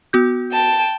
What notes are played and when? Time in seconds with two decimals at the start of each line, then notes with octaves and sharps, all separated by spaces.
0.13 B3 F#4 G6
0.52 G5 A5